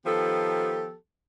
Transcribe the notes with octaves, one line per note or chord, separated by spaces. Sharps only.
D#3 F3 B3 G4 A4